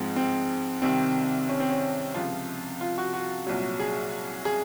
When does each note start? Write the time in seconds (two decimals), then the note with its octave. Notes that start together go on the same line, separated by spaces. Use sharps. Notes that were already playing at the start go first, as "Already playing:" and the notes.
Already playing: G#2 F3 G#3 C4
0.16 C4
0.82 C2 C3 D#3 C4
1.49 C#4
1.60 C4
1.70 C#4
2.14 C#2 C3 F3 F4
2.81 F4
2.98 F#4
3.14 F#4
3.47 C2 A#2 F#3
3.80 G#4
4.45 G#4